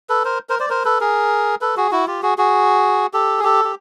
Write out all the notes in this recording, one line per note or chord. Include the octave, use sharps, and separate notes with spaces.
A4 B4
A#4 C5
A#4 C5
C5 D5
A#4 C5
A4 B4
G#4 A#4
A4 B4
F#4 G#4
E4 F#4
F4 G4
F#4 G#4
F#4 G#4
G4 A4
G#4
G4 A4
G4